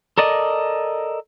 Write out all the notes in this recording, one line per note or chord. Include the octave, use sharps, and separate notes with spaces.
A4 A#4 D5 D#5